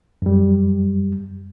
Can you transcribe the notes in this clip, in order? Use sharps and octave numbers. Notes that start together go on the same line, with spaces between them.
F#2 G3